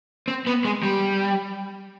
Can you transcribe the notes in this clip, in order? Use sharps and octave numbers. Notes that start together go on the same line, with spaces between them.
C4
B3
G#3
G3